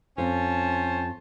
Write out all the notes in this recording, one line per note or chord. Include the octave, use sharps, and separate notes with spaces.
F2 C#4 C5 A5